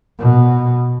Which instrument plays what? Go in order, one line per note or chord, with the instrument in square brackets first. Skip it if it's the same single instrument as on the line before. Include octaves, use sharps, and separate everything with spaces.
[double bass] B2